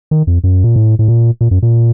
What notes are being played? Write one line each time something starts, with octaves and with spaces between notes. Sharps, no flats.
D#3
F2
F#2
A#2
A2
A2
A#2
A#2
F#2
A#2